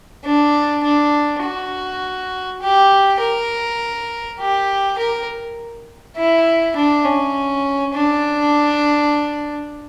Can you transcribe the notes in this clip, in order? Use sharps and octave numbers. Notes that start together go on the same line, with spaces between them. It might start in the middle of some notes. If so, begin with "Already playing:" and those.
D4
D4
F#4
G4
A#4
G4
A#4
E4
D4
C#4
D4